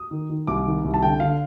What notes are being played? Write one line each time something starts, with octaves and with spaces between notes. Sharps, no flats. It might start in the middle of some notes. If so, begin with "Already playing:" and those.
Already playing: D#6
D#3
D#3
C2 D6
D#3
C2
A5
D3 G5
D3 F5